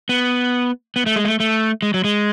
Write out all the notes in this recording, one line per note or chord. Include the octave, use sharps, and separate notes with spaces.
B3
B3
A3
G#3
A3
A3
G#3
F#3
G#3